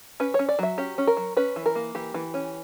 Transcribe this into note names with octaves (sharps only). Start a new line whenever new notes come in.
C#4 B4
C#4 C#5
D5
F#3 E5
C#4 G4
C#4
A#4
F#3
C#4 B4
E3
A#4
A#3
E3 G4
E3
C#4